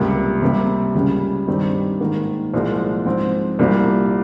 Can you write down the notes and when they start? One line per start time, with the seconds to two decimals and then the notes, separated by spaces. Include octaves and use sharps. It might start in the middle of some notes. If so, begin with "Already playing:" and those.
Already playing: C#2 C3 G3 A#3
0.42 C3 G3 A#3
0.95 C#2 C#3 G3
1.47 G2 D#3 G3 C4 D#4
2.00 G#2 D#3 A#3
2.53 C2 A#2 F3 G#3
3.06 G#2 F3 C4
3.59 C2 A#2 G3 A#3